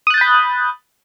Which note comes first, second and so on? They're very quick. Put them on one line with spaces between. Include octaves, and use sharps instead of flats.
D#6 F#6 A6 G6 B5